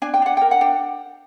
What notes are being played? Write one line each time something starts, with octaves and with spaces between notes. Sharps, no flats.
D4 G#5
G5
D4 F#5
A#4 G5
F#5
D4 G5